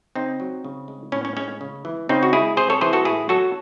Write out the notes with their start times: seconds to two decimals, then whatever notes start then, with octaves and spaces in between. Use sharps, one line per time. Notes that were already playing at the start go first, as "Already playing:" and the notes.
0.16 C#3 C4 D#4
0.40 F#3
0.64 C#3
0.88 G#3
1.12 A2 C#4
1.25 C#4
1.36 G#3 C#4
1.61 C#3
1.85 E3
2.09 C#3 C4 D#4
2.23 F#4
2.33 G#3 E4 G#4
2.57 C3 G#4 C5
2.70 A4 C#5
2.81 E3 G#4 C5
2.93 F#4 A4
3.05 A2 E4 G#4
3.29 F#3 F#4 A4